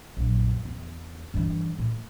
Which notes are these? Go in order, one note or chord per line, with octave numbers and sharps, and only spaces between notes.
A#1 F#2
E2
G2 E3
A2